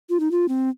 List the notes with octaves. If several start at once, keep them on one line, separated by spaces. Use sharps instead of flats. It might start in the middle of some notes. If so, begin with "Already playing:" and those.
F4
D#4
F4
C4